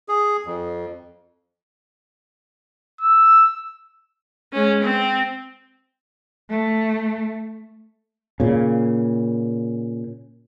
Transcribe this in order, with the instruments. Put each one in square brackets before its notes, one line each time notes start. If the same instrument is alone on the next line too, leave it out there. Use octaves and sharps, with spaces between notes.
[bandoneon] G#4
F2
[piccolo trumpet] E6
[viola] G#3 C#4
C4
[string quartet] A3
[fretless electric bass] A#2 C#3